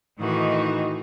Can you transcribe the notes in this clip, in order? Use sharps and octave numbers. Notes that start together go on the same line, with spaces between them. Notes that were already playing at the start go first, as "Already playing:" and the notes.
A2 D#3 E3 D#4 F#4